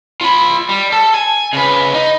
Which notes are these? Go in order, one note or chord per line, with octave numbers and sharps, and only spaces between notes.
F4 B5
G3
A4
G#5
C#3 B4
D#4